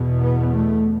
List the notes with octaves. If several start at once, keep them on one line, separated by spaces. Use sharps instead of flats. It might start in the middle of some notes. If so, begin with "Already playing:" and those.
Already playing: E2 B2
B3
A3